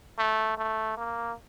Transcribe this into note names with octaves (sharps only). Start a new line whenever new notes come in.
A3
A3
A#3